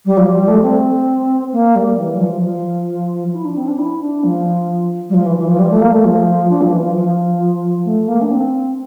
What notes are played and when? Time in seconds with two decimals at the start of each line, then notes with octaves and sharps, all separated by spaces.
0.05 G3
0.17 F3
0.32 G3
0.48 A3
0.62 C4
1.52 A#3
1.75 G3
1.97 E3
2.16 G3
2.20 F3
2.43 F3
3.33 E4
3.44 D4
3.55 C4
3.68 D4
3.78 E4
4.01 D4
4.24 F3
5.09 G3
5.14 F3
5.26 E3
5.37 E3
5.48 F3
5.59 G3
5.71 A3
5.81 A#3
5.93 A3
6.05 F3
6.49 D4
6.61 F3
6.72 E3
6.83 F3
6.95 F3
7.85 A3
8.08 A#3
8.21 D4
8.31 C4